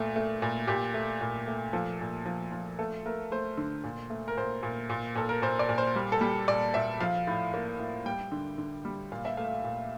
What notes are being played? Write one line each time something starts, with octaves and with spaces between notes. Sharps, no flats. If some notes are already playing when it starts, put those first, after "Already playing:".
Already playing: A#2 A3
A3
A#2
A#2 G4
A3
A#2
A3
F3 A4
A#2
F3
F3
A3 A4
A3 A#4
A3 C5
D3
A#2
A3
A#4
A#2 C5
A#2
A#2
A#2 A4
A#4
A#2 C5
D5
A#2
C5
G3
A4
G3
A#2 D5
A#2 E5
F3 F5
A2
A#3
A2
G3 G5
D3
D3
G3
A#2 F5
E5
A3 F5
A#2